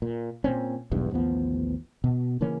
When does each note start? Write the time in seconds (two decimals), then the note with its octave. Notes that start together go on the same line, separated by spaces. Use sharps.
0.02 A#2
0.44 A#2 C4 C#4
0.92 E1 B1 E2 G2
1.11 A1 D#2 F3 B3
2.04 B2
2.41 C#3 E3 A#3 C#4